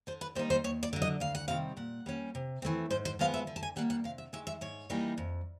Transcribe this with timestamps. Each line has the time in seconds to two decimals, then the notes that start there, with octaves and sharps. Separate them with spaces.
0.07 D3 C5
0.21 B4
0.35 G3 A#3 D#4 C5
0.50 C5
0.64 D#2 C#5
0.83 D5
0.93 D3 F#3
1.02 D#5
1.20 D2 F5
1.35 F#5
1.48 C3 D#3 G3 C4 F5
1.77 A#2 F#5
2.06 G3 A#3 C#4
2.35 C3
2.62 E3 A3 C4
2.90 G#2 C5
3.05 C5
3.19 F3 G#3 B3 F5
3.34 E5
3.47 D3
3.56 A5
3.63 G#5
3.76 G3 A#3 F#5
3.90 F#5
4.04 C3 F5
4.18 E5
4.33 D#3 G#3 E5
4.47 E5
4.61 G#2 C#5
4.90 E3 G3 A#3 D#4
5.18 F2